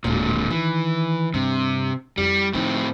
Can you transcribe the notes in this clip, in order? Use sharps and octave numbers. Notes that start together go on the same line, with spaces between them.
D1 G#1 A#2 D3
D#3 E3
G2 C3
F2 G3 E4
A2 F3 C4 D#4